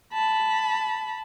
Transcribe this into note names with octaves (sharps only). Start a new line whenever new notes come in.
A5 B5